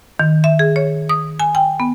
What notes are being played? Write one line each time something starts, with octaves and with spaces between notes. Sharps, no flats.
D#3
E5
G#4
C#5
D#6
G#5
G5
B3